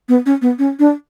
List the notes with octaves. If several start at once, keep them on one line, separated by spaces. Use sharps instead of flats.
B3
C#4
B3
C#4
D4